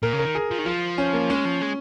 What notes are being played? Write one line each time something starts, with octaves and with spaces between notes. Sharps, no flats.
A#2 A#4
C#3
A#4
D#3
G#4
F3
D#3
F3 F4
C#4
A#3
G#3 C#4
F3
G#3